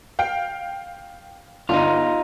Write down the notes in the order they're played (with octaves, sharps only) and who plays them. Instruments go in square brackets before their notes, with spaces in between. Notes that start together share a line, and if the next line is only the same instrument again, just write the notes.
[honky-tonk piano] F5 G5
[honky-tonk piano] G1 [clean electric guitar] D#4 F4